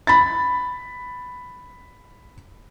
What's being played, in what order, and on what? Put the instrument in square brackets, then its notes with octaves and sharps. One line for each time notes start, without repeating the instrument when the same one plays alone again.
[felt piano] B5 A6